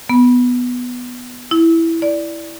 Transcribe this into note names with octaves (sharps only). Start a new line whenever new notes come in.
B3
E4
D5